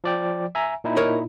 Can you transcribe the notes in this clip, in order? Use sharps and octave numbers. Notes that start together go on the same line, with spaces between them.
F3 D5 G5
E5 G#5 A#5
A#2 D#4 E4
A#4 C#5 D#5